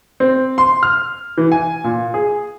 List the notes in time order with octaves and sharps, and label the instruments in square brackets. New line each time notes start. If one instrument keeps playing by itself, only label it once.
[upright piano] C4
C6
F6
E3
G#5
A#2
G#4